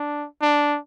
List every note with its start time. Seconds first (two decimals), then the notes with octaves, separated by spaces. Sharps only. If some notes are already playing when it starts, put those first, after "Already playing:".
Already playing: D4
0.42 D4